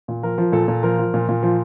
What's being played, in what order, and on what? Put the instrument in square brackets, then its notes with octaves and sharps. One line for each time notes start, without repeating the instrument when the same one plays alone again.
[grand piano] A#2
F3 A#4
F3
A#2 A4
A#2
F3 A#4
F3
A#2
A#2
F3